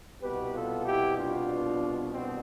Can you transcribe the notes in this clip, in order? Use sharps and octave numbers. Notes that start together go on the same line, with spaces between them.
C2 B2 B3 G4 B4
F4 A4
E4 G4
D4 F4
C4